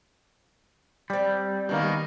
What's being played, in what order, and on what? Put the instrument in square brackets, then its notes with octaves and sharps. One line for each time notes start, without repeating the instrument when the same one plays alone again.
[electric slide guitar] G3 [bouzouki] C4 D5
[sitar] B2 D#3 A#3